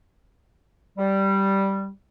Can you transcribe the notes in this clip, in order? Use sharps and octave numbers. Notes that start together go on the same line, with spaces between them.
G3